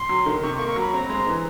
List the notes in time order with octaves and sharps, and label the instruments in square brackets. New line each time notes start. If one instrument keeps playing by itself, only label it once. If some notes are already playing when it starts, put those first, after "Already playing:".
Already playing: [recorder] C6
[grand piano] F#3
D#3
[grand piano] C3 [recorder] C#6
[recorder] C#6
[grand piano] A#3
[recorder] C#6
[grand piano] F#3 [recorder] B5
[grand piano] C4 [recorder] A#5
[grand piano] G#3
E3